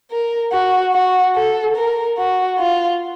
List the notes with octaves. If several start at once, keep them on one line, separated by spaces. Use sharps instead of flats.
A#4
F#4
F#4
A4
A#4
F#4
F4